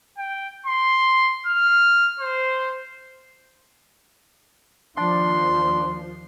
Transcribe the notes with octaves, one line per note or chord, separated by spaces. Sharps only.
G5
C6
F6
C5
D#2 F3 D4 C6